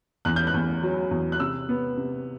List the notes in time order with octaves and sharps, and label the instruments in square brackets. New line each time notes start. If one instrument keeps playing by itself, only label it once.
[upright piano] E2 F#6
G6
F#6
E2
F#3
E2
F#6
C3 E6
B3
C3